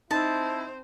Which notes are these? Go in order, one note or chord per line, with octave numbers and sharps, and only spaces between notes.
C4 D#4 E4 C5 A5